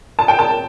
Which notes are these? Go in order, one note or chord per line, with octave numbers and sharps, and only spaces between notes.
A5
G5
A5